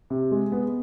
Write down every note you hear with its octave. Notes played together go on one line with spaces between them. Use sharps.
C3
G#3
B3